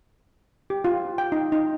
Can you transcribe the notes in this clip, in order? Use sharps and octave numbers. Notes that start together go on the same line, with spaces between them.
G4
F4
G5
D#4
D#4